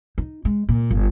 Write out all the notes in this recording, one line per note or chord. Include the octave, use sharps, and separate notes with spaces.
D#4
G#3
A#2
G1